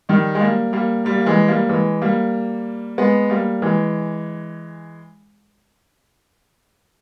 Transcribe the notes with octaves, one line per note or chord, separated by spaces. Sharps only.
D#3 G3
G#3
G3 A#3
G3 A#3
G3 A#3
A#3
E3 G#3
G3 A#3
E3 G#3
G3 A#3
G#3 B3
G3 A#3
E3 G#3